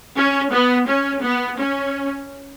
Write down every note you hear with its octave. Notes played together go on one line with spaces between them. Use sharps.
C#4
B3
C#4
B3
C#4